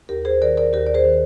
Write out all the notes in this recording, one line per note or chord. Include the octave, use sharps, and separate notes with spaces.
D#2 G4 A#4
G#4 C5
D#3 A#4 D5
A#4 D5
D#2 G4 A#4
D5
G#4 C5
D#3